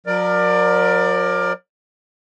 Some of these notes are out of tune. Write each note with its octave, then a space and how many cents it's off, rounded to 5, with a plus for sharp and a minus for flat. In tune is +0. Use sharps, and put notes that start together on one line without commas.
F#3 -40 A#4 +10 D5 +20